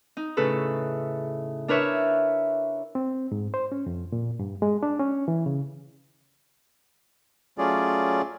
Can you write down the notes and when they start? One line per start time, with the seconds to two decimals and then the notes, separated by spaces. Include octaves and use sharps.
0.17 D#4
0.37 A2 C#3 A4 B4
1.68 D4 A#4 B4 C#5 E5
2.95 C4
3.32 G#2
3.54 C5
3.72 C#4
3.86 F2
4.12 A#2
4.39 G2
4.62 G#3
4.83 D4
5.00 C#4
5.28 E3
5.46 C#3
7.58 F#3 A3 C#4 F4 G#4 D5